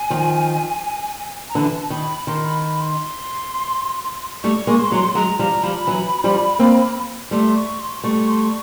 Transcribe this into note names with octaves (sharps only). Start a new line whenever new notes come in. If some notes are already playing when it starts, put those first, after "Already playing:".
Already playing: G#5
D#3 F3
A#5
D3 E3 A5
D#3 B5
D#3 C6
B5
B5
C6
G3 A3 C#6
G#3 A#3
C6
F#3 G#3
F#3 G#3 A#5
F3 G3 A#5
F3 G3 B5
E3 F#3
F3 G3
A#3 C4
G3 A3 C6
C#6
C6
G3 A3 C#6
C6
C#6